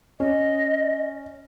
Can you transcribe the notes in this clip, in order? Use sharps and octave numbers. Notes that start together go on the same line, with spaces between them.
C#4 D#5